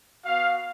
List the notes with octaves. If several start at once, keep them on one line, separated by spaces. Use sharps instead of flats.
B3 F#4 F5